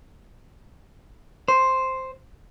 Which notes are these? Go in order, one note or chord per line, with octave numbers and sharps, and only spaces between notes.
C5